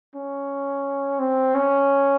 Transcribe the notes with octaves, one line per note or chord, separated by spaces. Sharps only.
C#4
C4
C#4